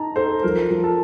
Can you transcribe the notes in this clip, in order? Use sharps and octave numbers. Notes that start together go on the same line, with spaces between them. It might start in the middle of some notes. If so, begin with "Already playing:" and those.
Already playing: D#4 A5 A#5
A4 C5
F3 A#4
F3
A4